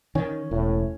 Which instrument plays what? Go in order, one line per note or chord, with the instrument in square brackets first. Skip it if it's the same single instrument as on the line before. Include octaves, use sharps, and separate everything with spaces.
[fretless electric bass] D#3 [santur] C#4
[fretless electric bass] E1 [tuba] A2